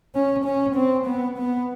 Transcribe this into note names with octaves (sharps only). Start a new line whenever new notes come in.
C#4
C#4
C4
B3
B3